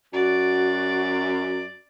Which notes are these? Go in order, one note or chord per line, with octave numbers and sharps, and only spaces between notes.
F#2 F#4 D5